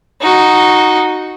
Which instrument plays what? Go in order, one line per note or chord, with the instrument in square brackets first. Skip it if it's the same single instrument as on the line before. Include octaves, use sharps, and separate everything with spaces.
[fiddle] D#4 F#4